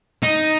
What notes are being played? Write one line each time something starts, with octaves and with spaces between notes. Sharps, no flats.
D#4